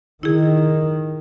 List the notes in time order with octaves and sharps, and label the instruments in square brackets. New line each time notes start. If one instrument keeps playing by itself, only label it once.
[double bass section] D#3 [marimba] E4 G#4